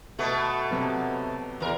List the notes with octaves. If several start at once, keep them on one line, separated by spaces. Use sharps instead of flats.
B2 A3
C3 F#3 B3
E2 A#4